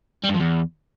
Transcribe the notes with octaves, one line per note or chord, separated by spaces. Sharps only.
G3
G2
F3
E2